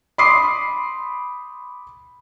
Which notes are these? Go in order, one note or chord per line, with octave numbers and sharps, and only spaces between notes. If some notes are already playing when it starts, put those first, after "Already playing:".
B5 C6 D6 D#6 C7